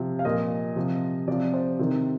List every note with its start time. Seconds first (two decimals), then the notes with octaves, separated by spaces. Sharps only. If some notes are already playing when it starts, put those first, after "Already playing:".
Already playing: C3 F3
0.19 F5
0.24 A#2 F3 D#5
0.76 C3 F3
1.28 C3 F3 D5
1.54 C5
1.79 C3 D#3